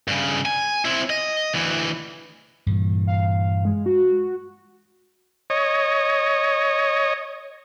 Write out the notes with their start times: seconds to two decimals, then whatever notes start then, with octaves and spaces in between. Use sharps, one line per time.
0.08 G2 C#3
0.45 G#5
0.85 C4 E4
1.10 D#5
1.54 D2 E3
2.66 G2 A#2 E3
3.07 F5
3.65 G#3
3.86 F#4
5.50 C#5 D#5